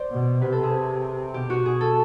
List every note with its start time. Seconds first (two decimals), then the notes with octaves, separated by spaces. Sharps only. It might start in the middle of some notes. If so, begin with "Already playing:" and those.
Already playing: C5 D5
0.11 B2
0.41 C3 B4
0.52 A4
0.63 G#4
1.34 B2 G4
1.50 F#4
1.65 B2 G#4
1.81 A4